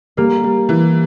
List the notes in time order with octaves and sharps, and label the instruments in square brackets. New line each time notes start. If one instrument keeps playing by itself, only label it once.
[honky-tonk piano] G3 [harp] A#3
[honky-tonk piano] G3
E3